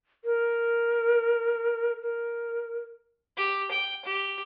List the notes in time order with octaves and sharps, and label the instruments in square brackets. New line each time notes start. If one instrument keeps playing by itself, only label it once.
[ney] A#4
A#4
[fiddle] G4
G5
G4